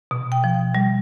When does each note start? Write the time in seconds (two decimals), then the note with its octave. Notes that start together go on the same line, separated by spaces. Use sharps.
0.11 B2
0.32 G5
0.44 F3
0.75 G3